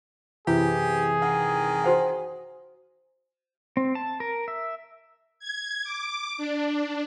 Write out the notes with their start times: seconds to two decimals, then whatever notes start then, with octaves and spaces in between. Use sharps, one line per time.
0.47 F#2 C3 E3 E4 G4 G#4
1.22 D#3 F#5
1.84 F#4 C5 F#5
3.77 C4
3.95 A5
4.20 A#4
4.48 E5
5.39 G#6
5.84 D6
6.38 D4